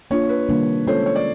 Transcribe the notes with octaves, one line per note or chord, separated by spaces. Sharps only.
A#3 D4 F4 C#5
B4
C3 D#3 G3 A#3 D4
G#3 C#4 F4 A4 C5 C#5
C#5
D5